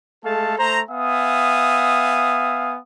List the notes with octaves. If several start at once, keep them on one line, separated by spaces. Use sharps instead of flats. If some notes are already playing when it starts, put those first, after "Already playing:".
G#3 A3 A4 F5 A5
A3 C5 A#5
B3 E5 F5 G#5 D#6